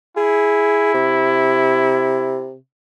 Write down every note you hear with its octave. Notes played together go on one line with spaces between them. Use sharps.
E4 G#4
C3